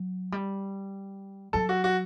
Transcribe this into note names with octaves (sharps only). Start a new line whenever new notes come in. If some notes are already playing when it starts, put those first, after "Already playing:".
Already playing: F#3
G3
F#3 A4
F#4
F#4